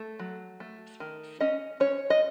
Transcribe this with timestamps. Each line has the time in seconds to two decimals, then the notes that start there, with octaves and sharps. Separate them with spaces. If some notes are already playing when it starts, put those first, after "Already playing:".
Already playing: A3 A4
0.19 F#3
0.60 A3
1.00 D#3
1.41 C#4 D#5
1.80 C#4 C#5
2.10 D#5